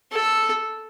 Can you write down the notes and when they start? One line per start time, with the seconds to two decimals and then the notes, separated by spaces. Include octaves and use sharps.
0.12 A4